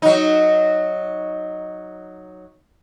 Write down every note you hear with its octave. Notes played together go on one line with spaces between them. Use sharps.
F#3 D#4